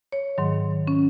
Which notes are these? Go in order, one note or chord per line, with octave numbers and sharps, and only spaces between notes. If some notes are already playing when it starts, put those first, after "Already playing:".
C#5
G#2 D#3 F#3
C#4